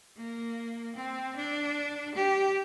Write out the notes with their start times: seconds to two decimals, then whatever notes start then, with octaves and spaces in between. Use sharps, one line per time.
0.17 A#3
0.95 C4
1.35 D4
2.15 G4